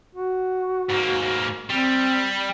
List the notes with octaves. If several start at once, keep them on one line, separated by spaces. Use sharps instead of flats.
F#4
G#2 A#3
G3 C4